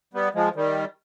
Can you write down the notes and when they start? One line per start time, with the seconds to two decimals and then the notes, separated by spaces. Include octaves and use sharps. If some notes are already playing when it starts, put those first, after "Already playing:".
0.14 G3 B3
0.34 F3 G#3
0.55 D#3 G3